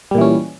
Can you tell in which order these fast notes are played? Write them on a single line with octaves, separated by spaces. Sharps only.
G3 A#2 E3 C#4